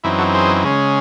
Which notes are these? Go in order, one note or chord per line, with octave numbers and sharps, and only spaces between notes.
F#2 E3 C4 D#4 E4
F#4 A4
G#4 C5
C#3 G#3 C#4